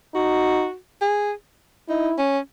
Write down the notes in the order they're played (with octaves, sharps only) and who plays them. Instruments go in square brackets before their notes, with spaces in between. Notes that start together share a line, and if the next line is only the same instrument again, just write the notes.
[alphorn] D#4 [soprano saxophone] F#4
[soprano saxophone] G#4
[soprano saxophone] D#4 [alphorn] E4
[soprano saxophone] C#4